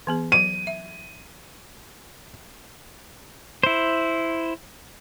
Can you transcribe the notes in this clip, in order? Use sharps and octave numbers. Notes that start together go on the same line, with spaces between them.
E3 B3 G#4
F#3 C5 D#7
E5
E4 C5